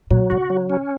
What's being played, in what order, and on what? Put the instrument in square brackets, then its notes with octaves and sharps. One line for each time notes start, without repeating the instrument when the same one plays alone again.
[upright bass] A#2 [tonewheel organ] F#3
[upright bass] C#3 [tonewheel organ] F#4
[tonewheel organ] F#3
C#4